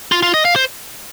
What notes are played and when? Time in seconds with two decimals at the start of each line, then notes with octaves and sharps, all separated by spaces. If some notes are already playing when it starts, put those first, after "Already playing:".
0.12 F4
0.23 F4
0.34 D#5
0.45 F5
0.56 C5